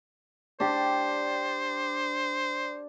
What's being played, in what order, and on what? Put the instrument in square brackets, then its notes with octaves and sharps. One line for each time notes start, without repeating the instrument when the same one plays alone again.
[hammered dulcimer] D4 G4 [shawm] C5